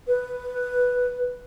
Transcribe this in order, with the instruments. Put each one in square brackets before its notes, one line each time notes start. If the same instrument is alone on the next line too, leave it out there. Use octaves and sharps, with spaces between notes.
[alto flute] B4